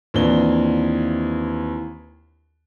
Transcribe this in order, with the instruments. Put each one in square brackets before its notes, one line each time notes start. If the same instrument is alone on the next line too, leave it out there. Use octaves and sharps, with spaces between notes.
[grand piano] D#2 E3 C4 D4 F4 G7